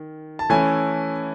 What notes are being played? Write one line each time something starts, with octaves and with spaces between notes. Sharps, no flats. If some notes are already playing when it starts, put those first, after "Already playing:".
Already playing: D#3
A5
E3 A3 C#4 E4 G#5